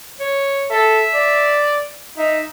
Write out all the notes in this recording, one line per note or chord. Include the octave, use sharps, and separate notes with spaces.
C#5
A4 E5
D5
D#4 E5